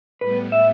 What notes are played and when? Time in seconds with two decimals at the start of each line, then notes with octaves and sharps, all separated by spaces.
0.21 A2 G3 B3 B4
0.52 E5